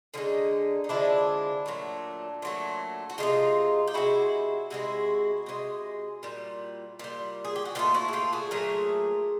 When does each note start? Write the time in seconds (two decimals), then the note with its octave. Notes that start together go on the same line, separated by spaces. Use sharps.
0.14 D3 F3 G#3 C#4 D#4
0.84 D#4
0.89 D3 F3 G#3 D4 E4
1.66 A#2 F#3 A3
2.42 A#2 F#3 A3
3.10 F#4
3.18 F3 G#3 D#4 F4
3.23 C3
3.88 G4
3.94 C3 F3 G#3 E4 F#4
4.70 C3 E3 G#3 E4 F#4
5.46 C3 E3 G#3
6.23 A#2 G3
6.99 A#2 G3
7.45 G#4
7.56 G4
7.65 F#4
7.75 A#2 F#3 A3 D#4 F4
7.94 E4 F#4
8.08 G#4
8.13 F4 G4
8.33 F#4 G#4
8.51 A#2 F#3 A3 G#4 A#4